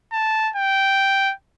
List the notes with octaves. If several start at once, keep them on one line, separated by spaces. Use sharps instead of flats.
A5
G5